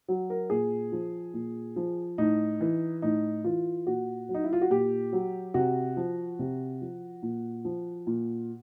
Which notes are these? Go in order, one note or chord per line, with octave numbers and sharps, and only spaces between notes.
F#3
A#4
A#2 G#4
F3
A#2
F3
A2 D#4
E3
A2 D#4
E3 F4
A#2 F#4
F#3
D#4
E4
F4
F#4
A#2 G4
F#3
C3 F#4
F3
C3
F3
A#2
F3
A#2